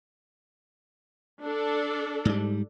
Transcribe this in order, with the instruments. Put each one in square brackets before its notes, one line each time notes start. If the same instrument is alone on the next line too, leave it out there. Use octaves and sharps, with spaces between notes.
[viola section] D4 A4
[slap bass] G#2 G3